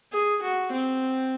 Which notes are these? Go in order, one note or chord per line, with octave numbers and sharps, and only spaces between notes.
G#4
F#4
C4